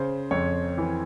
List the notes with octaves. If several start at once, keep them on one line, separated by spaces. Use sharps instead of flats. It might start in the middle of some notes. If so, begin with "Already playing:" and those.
Already playing: C#3 C5
F2 C#5
E3